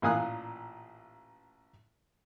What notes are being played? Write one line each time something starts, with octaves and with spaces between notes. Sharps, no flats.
A1 A#2 F5 G#5 D#6 F#6